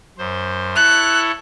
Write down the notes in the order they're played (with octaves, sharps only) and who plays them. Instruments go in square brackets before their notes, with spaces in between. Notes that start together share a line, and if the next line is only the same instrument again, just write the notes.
[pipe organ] F#2 C5
[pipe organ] E4 A4 C#5 [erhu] F#6